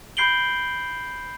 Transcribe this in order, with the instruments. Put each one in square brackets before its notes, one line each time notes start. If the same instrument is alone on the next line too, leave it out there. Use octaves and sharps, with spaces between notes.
[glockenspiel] B5 G6 C7 D7 F#7 G7